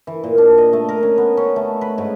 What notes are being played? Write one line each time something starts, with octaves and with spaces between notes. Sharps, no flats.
E3
A#2
D4
D#5
A3
A#4
C#4
B3
C#4
A3
B4
G#2